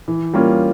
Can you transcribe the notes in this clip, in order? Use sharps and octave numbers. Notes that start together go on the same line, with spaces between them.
E3
G3 A#3 C#4 F4